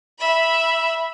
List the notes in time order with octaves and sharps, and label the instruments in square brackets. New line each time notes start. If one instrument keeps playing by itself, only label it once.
[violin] E5 B5